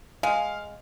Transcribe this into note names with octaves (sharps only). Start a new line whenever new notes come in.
G#3 F5